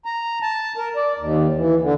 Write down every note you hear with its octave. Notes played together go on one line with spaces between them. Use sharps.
A#5
A5
A#4
D5
D#2
E3
D3